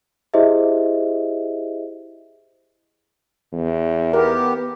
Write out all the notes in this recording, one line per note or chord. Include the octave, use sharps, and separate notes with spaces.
E4 G4 G#4 C5 D#5 E5
E2
B3 G4 A#4